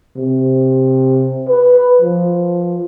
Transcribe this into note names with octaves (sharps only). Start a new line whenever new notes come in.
C3
B4
F3